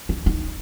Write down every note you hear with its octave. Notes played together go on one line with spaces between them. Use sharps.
D4
D#4